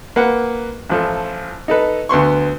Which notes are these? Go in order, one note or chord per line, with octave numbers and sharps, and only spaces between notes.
A#3 B4 F#5
A1 F3 A4
D#4 A4 B4
D2 B3 C6 C#6